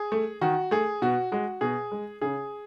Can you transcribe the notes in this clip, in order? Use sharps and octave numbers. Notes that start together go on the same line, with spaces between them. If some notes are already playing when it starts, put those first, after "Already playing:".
Already playing: G#4
A3
D#3 F#4
A3 G#4
B2 F#4
G#3 F#4
B2 G#4
G#3
C#3 G#4